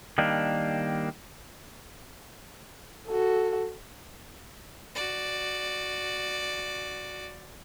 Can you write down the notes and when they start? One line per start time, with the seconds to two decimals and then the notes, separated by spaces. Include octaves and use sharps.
0.18 D#3 G3 A#3 D4
3.07 F#4 A4
4.95 F#4 D5